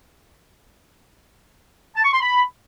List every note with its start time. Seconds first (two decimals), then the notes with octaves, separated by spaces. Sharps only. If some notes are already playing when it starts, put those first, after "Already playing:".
1.96 A5
2.04 C#6
2.13 C6
2.21 B5